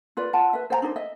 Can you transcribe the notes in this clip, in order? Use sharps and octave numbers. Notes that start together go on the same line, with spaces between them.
F4 B4 D5
F4 F#5 A5
B4 E5
C5 G5 A#5
D4 D#4 A4 C5
D#5 E5